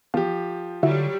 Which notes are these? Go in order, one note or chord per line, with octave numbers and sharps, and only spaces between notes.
E3 F3 B3 G4 F5
D3 F#3 G3 E4 F#4 E5